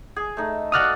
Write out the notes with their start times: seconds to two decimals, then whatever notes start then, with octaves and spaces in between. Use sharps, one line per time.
0.16 G#4
0.37 A3 D#4
0.72 F#4 D5 F5 D#6 F6 F#6